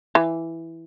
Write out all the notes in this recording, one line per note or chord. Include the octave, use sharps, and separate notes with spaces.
E3